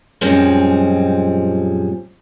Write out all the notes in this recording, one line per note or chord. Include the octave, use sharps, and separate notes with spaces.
F#2 A#2 F3 G3 G#3 C4